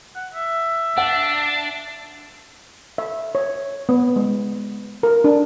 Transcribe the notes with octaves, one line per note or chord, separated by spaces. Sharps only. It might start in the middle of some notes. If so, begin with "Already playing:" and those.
F#5
E5
D4 F#5
E5
C#5
B3
G#3
A#4
D4